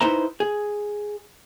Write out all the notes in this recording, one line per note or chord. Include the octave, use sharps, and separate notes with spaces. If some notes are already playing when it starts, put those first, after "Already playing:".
D#4 E4 B4 C5 E5 A#5
G#4